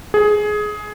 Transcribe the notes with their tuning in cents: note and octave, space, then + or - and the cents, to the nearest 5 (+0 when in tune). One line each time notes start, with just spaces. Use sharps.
G#4 +15